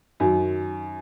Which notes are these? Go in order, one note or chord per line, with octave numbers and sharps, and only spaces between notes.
F#2 D#3 F#3